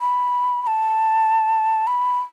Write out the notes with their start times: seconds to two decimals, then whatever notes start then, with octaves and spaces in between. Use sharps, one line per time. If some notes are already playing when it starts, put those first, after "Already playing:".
0.01 B5
0.62 B5
0.67 A5
1.87 B5